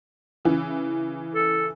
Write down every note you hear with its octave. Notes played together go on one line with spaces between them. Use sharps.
C#3 E3
A4